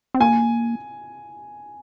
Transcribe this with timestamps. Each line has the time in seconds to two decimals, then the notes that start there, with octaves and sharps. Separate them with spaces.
0.14 C4
0.20 A#3 G#5